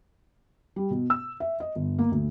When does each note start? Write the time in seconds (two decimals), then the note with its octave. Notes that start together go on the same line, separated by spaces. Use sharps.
0.76 G3
0.91 B2
1.10 E6
1.40 E5
1.60 D#5
1.75 G1
1.99 A#3
2.12 D2